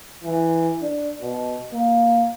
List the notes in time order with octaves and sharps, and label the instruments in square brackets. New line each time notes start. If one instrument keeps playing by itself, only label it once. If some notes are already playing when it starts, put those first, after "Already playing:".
[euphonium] E3
D4
B2
A#3